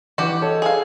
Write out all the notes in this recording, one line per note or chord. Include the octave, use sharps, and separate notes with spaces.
E3 F#4 G4
A4 C#5 D#5
G#4 F5